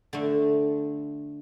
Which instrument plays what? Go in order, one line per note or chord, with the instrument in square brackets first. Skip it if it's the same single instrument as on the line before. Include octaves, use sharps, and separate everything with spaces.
[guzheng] D3 A3